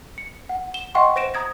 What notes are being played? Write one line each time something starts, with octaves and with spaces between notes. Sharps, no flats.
C#7
F#5
E7 G7
D#5 E5 F#5 G5 C6 C#6
C5 A#6 D7 E7
A#5 D#6 G#6 A#6